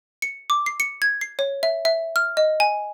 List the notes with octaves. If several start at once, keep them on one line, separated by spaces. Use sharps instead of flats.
C#7
D6
C7
C#7
G#6
C7
C#5
E5
E5
F6
D#5
G#5